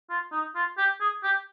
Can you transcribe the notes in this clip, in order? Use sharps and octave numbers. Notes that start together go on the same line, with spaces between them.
F4
D#4
F4
G4
G#4
G4